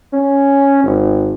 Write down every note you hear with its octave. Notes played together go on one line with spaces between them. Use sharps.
C#4
G#1